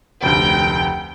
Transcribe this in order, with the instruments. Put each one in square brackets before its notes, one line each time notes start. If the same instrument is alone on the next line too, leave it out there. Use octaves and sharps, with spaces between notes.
[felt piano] F1 D2 [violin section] G5